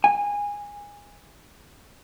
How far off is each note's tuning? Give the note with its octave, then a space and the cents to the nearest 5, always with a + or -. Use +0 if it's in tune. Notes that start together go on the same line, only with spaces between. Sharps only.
G#5 -20